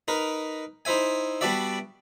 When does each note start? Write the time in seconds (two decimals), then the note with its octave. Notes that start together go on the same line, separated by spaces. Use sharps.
0.08 D#4 A#4 B4
0.85 D#4 E4 C5 E5 G#5
1.41 G3 B3 D4 F#4 D5 E5